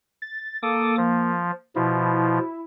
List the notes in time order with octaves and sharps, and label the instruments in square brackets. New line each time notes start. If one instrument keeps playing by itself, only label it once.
[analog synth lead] A6
[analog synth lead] A#3 [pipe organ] A4 D6 D#6
[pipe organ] F3
[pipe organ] B2 F3 [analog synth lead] E4